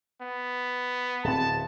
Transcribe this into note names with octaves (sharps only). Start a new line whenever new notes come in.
B3
D1 C4 A5